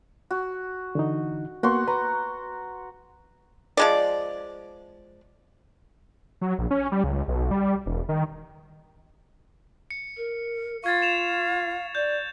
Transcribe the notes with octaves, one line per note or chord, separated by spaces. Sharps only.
F#4
D3 E3 D#4
A#3 B3 F#4 C6 C#6
B4 A#5
F3 G#3 D5
F#3
A#1
C#4
G3
C#2
B1
G3
E1
D#3
C#7
A#4
F4 F5 C#6 G#6 A6
E7 F7
D5 G6